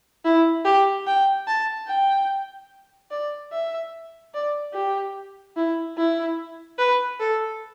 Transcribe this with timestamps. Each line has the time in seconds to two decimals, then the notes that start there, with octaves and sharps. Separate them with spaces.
0.25 E4
0.65 G4
1.07 G5
1.48 A5
1.88 G5
3.11 D5
3.52 E5
4.34 D5
4.74 G4
5.57 E4
5.98 E4
6.78 B4
7.20 A4